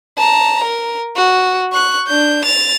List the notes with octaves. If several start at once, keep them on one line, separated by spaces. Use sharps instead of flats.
A5 A#5
A#4
F#4
C#6 F#6
D4 G6
A6 F7